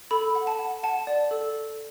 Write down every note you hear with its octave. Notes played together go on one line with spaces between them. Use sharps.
A4 B5
F#5
A5
F#5
F#5 A5
D5
A4